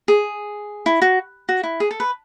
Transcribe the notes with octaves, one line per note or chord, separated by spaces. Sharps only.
G#4
E4
F#4
F#4
E4
G#4
A4
B4